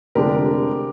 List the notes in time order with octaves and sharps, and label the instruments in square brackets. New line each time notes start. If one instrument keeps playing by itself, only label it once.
[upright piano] F1 F2 D3 G#3 D4 [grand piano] G4 A#4